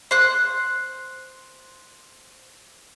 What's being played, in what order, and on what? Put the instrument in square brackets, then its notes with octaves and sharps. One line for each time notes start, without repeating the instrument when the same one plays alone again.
[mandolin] C5 F#6